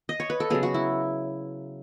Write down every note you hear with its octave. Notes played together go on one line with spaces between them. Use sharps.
D#5
C#5
B4
A4
C#3 F#3 B3 G#4
F#4
E4